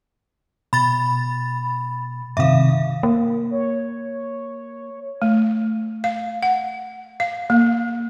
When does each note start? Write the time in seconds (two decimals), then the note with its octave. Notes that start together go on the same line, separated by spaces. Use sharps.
0.73 B2 B5 A6
2.37 G2 C3 D#3 E5 F5
3.03 A#3
3.51 C#5
5.22 A3
6.04 F5
6.43 F#5
7.20 F5
7.50 A#3